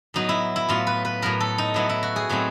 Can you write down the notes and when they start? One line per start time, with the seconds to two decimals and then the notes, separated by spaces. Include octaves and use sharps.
0.14 A2 F#3 B3 D#4
0.29 E4
0.56 E4
0.68 A2 F#3 B3 F4
0.87 B4
1.05 B4
1.22 A2 F#3 B3 A#4
1.40 A4
1.58 D#4
1.74 A2 F#3 B3 E4
1.89 E4
2.03 F#4
2.16 G#4
2.29 A2 F#3 A3 C4 D#4